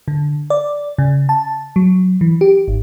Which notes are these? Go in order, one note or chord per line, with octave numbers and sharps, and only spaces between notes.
D3
D5
C#3
A5
F#3
E3
G4
G#1